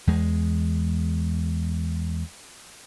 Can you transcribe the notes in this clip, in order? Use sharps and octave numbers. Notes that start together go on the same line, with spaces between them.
E2 G#3